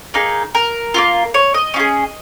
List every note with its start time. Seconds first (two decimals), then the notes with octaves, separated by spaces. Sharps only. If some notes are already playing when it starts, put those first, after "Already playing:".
0.14 A#3 D#4 G#4
0.55 A#4
0.94 A#3 C#4 F4
1.34 C#5
1.54 D#5
1.74 C#4 F4
1.80 G#4